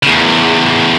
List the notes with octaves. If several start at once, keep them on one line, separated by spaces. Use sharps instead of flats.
E2 C#3